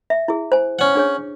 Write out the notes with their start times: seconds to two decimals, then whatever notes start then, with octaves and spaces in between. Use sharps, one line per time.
0.10 E5
0.28 E4 G#4
0.52 C5 G#5
0.79 C#4 F#5
0.95 D4 G#4 C#5